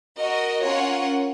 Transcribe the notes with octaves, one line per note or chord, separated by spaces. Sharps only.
F#4 A#4 D#5
C#4 F4 A#4 C#5 F#5